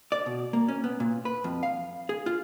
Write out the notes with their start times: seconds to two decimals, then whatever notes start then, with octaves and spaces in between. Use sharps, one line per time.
0.12 D5
0.26 B2
0.53 A#3
0.68 C#4
0.84 B3
1.00 A#2
1.25 B4
1.44 F2
1.63 F5
2.09 G#4
2.26 F4